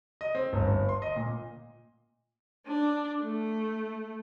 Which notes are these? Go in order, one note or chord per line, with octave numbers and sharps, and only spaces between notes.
D#5
C4
G1
G1
C6
D#5
A#2
D4
A3